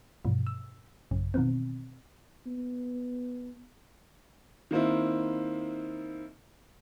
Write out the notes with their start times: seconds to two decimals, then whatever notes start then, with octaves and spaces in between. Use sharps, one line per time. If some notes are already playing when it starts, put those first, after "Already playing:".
0.25 G2 B2 E3 F3
0.47 E6
1.11 A1 F#2 C#3
1.34 B2 D#3 E3 B3 C4
2.47 B3
4.71 D#3 A#3 C4 E4